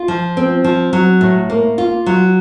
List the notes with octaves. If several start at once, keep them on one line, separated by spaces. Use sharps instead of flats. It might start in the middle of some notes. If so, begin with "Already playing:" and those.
Already playing: F4
F3
C4
F3
F#3
A2
A#3
F4
F#3